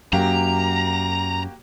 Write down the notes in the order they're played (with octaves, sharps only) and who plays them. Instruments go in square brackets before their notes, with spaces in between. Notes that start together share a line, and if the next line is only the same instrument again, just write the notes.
[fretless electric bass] F#2 [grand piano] A#3 F#4 G4 [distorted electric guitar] A#5